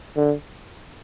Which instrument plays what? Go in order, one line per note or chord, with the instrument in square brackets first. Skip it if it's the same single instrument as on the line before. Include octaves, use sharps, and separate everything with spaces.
[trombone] D3